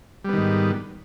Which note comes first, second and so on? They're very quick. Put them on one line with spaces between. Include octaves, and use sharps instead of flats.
G3 B3 D#3 G#2